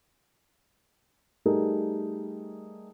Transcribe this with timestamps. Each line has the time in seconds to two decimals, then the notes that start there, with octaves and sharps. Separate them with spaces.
1.45 G3 A3 D#4 G#4 A#4